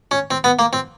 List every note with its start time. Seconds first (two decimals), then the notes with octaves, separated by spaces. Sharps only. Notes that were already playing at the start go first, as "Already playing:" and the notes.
0.11 C#4
0.31 C4
0.44 B3
0.59 A#3
0.73 C4